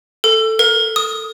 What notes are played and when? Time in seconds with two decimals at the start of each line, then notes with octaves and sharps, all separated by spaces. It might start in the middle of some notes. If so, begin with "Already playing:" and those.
0.24 A4
0.59 A#4
0.96 D#6